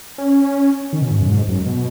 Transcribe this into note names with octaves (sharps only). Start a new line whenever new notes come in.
C#4
D#3
B2
G#2
F#2
G#2
F#2
B2